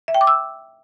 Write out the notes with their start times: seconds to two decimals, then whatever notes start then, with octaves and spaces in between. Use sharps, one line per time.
0.08 E5
0.14 G5
0.21 D6
0.27 E6